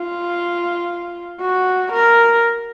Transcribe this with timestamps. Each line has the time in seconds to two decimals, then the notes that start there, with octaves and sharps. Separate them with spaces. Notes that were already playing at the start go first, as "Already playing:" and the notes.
Already playing: F4
1.41 F#4
1.93 A#4